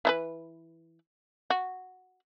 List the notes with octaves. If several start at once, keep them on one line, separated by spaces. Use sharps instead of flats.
E3 D#4 B4
F#4